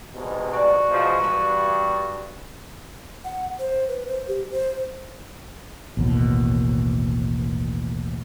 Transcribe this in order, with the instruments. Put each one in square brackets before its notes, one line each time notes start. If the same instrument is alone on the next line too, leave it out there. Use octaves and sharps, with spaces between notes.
[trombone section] C2 G#2 B2
[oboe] F#4 [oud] D5
[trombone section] G#2 B2 F3
[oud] E2 B4 [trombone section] G2
[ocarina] F#5
C5
B4
C5
G4
C5
[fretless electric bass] A1 D#2 B2